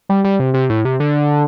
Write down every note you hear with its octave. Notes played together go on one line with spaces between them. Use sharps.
G3
G3
C3
C3
A2
C3
D3